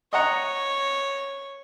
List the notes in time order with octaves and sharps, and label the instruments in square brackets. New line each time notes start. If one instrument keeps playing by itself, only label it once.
[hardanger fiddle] C#5 [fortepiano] D#5 F#5 A#5